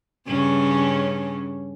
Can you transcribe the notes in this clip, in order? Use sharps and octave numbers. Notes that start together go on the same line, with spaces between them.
G2 C#3 C#4